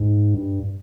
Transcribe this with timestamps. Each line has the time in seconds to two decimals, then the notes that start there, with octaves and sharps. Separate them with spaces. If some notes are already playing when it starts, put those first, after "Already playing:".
Already playing: G#2
0.34 G2